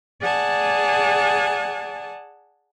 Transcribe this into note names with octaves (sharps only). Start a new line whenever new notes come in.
G#4 D5 F#5 G#5 A5